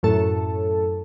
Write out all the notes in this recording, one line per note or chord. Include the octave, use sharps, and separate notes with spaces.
F#2 A2 A4